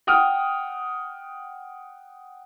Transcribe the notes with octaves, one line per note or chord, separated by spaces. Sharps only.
F#5 G5 D#6 F6